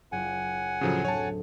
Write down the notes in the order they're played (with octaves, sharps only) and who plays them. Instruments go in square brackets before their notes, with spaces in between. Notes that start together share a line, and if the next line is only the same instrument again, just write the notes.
[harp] F#1 F4 [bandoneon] F#5 G#5
[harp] D2 A2 [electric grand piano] C#3 F3 F#3
[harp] F#3 C4 [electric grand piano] C#5 A5